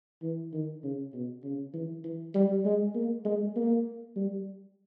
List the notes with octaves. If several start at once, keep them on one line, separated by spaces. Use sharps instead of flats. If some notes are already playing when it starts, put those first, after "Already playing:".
E3
D#3
C#3
B2
C#3
E3
E3
G3
G#3
A#3
G#3
A#3
G3